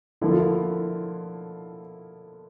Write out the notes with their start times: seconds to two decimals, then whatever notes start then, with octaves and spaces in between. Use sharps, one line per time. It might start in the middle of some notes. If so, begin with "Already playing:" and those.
0.21 D3 F3 A#3 E4
0.31 F4
0.40 E4